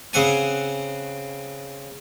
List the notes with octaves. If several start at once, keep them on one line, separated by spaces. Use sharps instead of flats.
C#3 C4 F#5 G#5